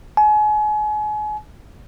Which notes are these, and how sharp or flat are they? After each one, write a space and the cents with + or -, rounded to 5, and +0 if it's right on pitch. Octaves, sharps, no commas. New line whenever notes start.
G#5 +35